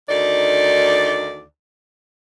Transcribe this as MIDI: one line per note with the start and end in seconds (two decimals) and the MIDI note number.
0.09 1.43 38
0.09 1.43 51
0.09 1.43 63
0.09 1.43 74